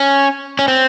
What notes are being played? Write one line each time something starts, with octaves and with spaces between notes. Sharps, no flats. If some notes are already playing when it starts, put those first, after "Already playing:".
Already playing: C#4
C#4
C4